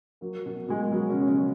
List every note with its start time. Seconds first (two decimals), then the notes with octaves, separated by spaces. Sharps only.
0.21 F#3 A#3
0.46 B2
0.68 B2 G#3
0.82 A#3
0.91 B2 F#3 B3
1.10 C#3 C#4
1.15 F#3
1.27 C#3 C#4